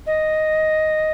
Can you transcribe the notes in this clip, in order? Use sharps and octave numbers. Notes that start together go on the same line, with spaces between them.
D#5